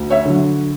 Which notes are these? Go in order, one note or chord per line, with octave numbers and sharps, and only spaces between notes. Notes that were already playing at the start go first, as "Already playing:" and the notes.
Already playing: D2
C#5 E5
D3 F#3